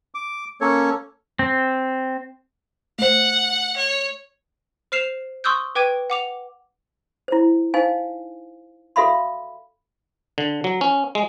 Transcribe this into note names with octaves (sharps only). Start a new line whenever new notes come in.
D6
A#3 C#4 A4 C#5
C4
A3 C5 F#5
C#5
C5 F6 C7 E7 F7
C6 C#6 D#6 E6 F#6 G6
B4 G5 D6 G#6 D#7
F#5 D6 F7
E4 C5
D#4 C5 F5 G#5
F#4 A4 E5 F5 B5 C6
D3
F#3
C#4
G#3